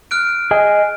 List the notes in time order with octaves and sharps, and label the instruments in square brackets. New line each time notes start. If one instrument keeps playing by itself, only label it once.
[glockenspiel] F6 F#6 D7
[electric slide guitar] G#4 D#5 G#5